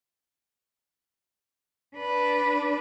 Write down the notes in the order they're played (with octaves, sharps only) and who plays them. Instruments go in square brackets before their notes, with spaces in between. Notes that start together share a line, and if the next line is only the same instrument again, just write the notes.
[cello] D4 B4